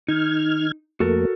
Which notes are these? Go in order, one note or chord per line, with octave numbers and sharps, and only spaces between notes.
D#3 D#4 F6 G#6
F2 A3 A#3 F#4 A4 A#4